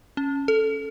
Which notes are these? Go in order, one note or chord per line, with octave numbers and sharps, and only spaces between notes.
C#4
A4